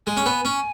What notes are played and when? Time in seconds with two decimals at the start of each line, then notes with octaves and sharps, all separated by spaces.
0.07 G#3 G#5
0.17 C#4
0.26 B3
0.45 C#4